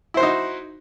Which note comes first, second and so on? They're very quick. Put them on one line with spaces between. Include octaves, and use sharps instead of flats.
E4 C5 F#4 D#4